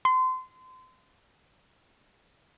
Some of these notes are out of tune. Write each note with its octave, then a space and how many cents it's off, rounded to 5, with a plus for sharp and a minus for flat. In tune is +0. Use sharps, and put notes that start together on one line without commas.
C6 -30